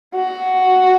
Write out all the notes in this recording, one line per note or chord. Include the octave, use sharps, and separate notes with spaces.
F#4